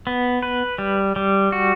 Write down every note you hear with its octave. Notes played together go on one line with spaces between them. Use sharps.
B3
B4
G3
G3
F#4